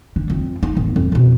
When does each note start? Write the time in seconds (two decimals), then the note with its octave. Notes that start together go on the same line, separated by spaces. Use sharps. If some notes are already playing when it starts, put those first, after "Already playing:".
0.16 D3
0.30 F2
0.63 D#4
0.77 D1
0.96 F2
1.12 F2 B2